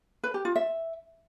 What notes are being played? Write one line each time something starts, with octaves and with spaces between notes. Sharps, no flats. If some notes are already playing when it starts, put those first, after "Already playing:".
B4
G4
F4
E5